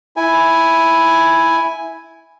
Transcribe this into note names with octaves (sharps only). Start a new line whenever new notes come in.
E4 G#5